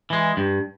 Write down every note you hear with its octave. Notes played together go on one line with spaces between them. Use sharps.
E3 G#3
G2